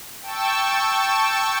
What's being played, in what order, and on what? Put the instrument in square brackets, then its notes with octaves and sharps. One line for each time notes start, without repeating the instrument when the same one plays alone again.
[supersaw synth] G5 A5 C#6 E6